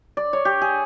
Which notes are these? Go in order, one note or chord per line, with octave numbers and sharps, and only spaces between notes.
D5
C#5
G4
G#4